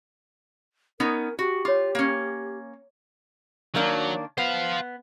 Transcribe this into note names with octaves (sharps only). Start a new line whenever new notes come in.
B3 C#4 D#4 A#4
F#4 G4
F4 C#5 D6
A#3 C#4
D#3 F#3 A#3 D4
B3 C5 F5